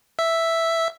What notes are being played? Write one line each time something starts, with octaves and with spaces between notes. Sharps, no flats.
E5